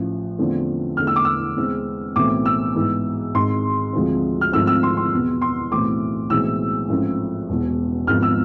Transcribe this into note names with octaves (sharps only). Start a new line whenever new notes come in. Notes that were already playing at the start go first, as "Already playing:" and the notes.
Already playing: A1 A2 F3
E2 D3 F3 A3 C4
E2 D3 A3 F6
E6
D6
E6
E2 C3 G#3 C4
B1 A2 E3 A3 C4 D6
E6
G#2 E3 B3
G#1 G#2 G#3 C6
D2 C3 F3 G#3 C4
F6
G#1 G#2 F3 A3 C4 E6
E6
C6
C6
E2 B2 B3
C6
B1 A2 E3 A3 C4 D6
B1 A2 E3 G#3 C4 E6
A1 G#2 F3 A3 C4
E1 E2 B2
G#1 G#2 F3 B3 F6
E6